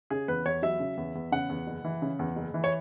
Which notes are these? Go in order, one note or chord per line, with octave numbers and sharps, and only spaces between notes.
C#3 G#4
E2 B4
E2 C#5
F#3 E5
C#3
E2
E2
C#3 F#5
E2
F#1
E3
C#3
E2
F#1
E3
C#5